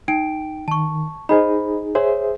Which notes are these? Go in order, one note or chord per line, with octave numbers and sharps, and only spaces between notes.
D#4 G5 D7
D#3 A5 C#6
D#4 G#4 C5 D#5 B5
G#4 C5 C#5 E5